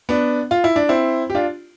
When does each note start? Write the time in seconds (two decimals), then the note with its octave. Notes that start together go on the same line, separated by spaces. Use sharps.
0.09 B3 D4
0.51 F4
0.64 E4
0.76 D4
0.89 C4 E4
1.30 G4
1.35 D4 F4